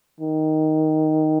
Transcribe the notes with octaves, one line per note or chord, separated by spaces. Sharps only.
D#3